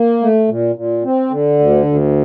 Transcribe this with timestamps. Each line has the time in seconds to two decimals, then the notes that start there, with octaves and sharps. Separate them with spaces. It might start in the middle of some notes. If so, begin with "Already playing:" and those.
Already playing: A#3
0.22 A3
0.49 A#2
0.75 A#2
1.04 C4
1.31 D3
1.59 D2
1.86 D2